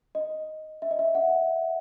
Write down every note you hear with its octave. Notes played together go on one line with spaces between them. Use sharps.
D#5
E5
D#5
E5
F#5